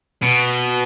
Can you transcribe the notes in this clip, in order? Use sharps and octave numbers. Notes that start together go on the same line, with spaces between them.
B2